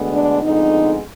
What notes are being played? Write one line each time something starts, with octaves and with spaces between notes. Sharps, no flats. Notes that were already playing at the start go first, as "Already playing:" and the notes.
Already playing: D2 D3 G#3 B3
D4
F2 D3 G#3 B3 D#4